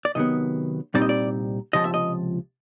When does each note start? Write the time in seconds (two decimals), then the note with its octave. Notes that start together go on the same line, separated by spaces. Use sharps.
0.05 D5
0.15 C3 D#3 F#3 B3 D#5
0.94 C2 A#2 G3 C4 D#4 D5
1.02 D#5
1.09 D5
1.73 C#2 C3 F3 D#5
1.84 E5
1.94 D#5